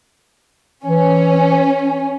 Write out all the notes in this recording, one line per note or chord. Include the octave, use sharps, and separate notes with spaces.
E3 C#4